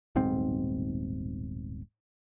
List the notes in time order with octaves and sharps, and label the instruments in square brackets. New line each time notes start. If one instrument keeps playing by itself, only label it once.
[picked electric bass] D#1 B1 G#2 C4